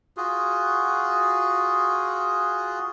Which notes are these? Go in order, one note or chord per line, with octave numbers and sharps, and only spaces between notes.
F4 F#4 G#4